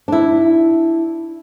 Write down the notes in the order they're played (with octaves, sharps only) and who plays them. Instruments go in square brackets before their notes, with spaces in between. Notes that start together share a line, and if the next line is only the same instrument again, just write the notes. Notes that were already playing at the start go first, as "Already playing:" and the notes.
[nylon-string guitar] D4 E4